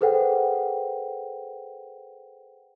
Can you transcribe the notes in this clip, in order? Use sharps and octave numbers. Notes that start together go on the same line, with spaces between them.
G#4 A4 B4 C5 F#5 G5